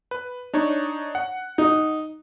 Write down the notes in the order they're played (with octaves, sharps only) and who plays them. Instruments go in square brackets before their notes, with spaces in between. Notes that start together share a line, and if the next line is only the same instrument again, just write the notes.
[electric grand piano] B4
D4 D#4 C#5
F#5
[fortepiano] D#4